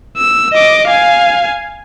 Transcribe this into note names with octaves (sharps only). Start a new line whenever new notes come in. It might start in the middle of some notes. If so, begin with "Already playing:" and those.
E6
D#5 D6
F5 G#5